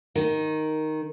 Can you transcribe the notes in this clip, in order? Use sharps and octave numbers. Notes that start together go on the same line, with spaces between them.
D#3